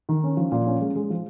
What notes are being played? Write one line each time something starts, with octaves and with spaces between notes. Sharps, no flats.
D#3
C#4
F3
A#2
C#4
G#3
G#3
F3